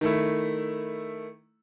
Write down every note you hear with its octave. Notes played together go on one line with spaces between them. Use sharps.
D#3 A3 E4